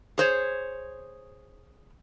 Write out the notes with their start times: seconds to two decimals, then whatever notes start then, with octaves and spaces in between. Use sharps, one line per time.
0.18 G#4 C5 C#5